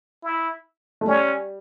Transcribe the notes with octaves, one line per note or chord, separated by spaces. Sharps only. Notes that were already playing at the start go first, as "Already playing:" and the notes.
E4
A3
G3 C#4